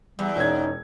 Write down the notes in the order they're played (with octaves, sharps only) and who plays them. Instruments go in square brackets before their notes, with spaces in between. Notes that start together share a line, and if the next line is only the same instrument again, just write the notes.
[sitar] E2 [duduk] G3
[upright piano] E1 C#4 G#6 [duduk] D#4